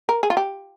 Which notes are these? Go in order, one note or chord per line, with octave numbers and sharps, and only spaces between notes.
A#4
G#4
F4
G4